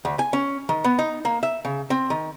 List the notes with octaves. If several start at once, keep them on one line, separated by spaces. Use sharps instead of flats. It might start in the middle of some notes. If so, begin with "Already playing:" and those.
D2
G#5
C#4
D#3
B3
D#4
A#3
E5
C#3
C4
D#3